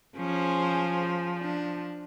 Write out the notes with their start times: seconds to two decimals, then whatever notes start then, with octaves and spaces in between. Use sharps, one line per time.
0.17 F3 C#4 G#4 C5
1.38 D4